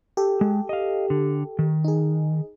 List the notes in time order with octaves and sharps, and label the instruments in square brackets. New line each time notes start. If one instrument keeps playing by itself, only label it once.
[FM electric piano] G4 A4
[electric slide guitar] G#3
D#5 F5
D3
D#3
[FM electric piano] D#4 G#4